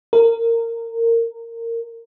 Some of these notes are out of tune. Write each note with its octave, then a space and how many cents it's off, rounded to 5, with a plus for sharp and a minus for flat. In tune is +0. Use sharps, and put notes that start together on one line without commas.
A#4 -20